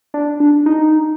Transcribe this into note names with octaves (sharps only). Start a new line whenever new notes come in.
D4
D4
D#4